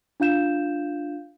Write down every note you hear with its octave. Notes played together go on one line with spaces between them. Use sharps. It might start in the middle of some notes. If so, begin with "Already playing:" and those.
D4 F4 F5 G6 E7